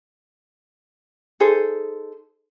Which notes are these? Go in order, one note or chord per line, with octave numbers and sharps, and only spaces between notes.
D#4 G#4 A4 C5